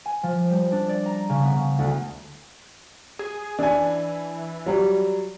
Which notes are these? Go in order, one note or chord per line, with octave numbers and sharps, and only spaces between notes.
G#5
F3
G3
D4
D5
A#5
C#3
B3
C#3
D2
G#4
E3 D4 G#5
F#3 G3